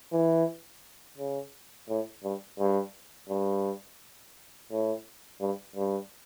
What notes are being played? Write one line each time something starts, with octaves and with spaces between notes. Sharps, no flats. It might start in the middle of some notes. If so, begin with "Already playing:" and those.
E3
C#3
A2
G2
G2
G2
A2
G2
G2